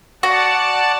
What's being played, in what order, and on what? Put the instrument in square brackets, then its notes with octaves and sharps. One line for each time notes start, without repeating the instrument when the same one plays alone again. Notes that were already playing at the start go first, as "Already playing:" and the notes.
[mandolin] F#4 [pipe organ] D5 F#5 A5